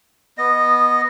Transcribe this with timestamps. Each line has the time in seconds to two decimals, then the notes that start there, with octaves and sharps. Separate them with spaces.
0.38 B3 D#5